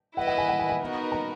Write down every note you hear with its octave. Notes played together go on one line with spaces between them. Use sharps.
E4 B4 D#5 F#5
F#5
G#5
F#5
G#5
G#5
B3 D#4 F#4 A#4
A#5